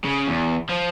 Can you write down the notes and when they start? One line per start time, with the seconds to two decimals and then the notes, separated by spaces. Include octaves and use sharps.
0.05 C#3
0.28 E2
0.69 F3